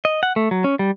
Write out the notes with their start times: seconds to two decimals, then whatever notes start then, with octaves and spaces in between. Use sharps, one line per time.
0.05 D#5
0.23 F#5
0.36 A3
0.51 F#3
0.64 C#4
0.79 G3